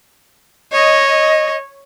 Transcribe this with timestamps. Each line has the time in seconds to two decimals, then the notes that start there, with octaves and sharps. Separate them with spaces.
0.72 C#5 D#5